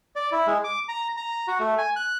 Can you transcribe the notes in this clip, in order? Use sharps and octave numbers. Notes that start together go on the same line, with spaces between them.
D5
E4
G#3
D6
A#5
A#5
F#4
A3
G#5
F#6